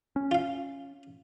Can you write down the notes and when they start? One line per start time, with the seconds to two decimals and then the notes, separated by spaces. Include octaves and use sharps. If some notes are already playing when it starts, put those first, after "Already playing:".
0.16 C#4
0.31 F4 F5